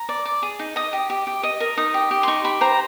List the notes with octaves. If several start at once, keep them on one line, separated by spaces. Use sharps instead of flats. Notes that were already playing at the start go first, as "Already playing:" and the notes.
Already playing: A#5
D5
D5
G#4
D#4
D#5 D#6
G4
G4
G4
D#5
A#4
D#4 D#6
G4
G4
C6
D#4 C#6
G4 B5
C5 A#5